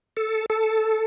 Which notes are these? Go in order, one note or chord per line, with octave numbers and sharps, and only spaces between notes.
A4
A4